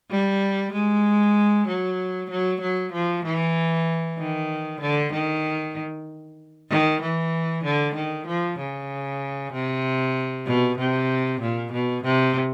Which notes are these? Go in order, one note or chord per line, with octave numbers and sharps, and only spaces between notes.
G3
G#3
F#3
F#3
F#3
F3
E3
D#3
D3
D#3
D#3
E3
D3
D#3
F3
C#3
C3
B2
C3
A#2
B2
C3